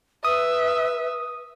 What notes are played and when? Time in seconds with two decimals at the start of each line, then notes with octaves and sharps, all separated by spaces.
0.24 B4 E5 D#6